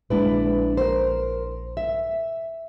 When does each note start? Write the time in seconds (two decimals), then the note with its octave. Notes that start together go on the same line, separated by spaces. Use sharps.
0.10 A#1 G#3 D4 E4 B4
0.77 A#4 C5
1.77 E5